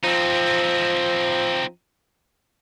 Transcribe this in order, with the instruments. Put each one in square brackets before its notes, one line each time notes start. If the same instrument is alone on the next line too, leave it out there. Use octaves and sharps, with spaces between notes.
[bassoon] F3 [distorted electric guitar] C4 D#4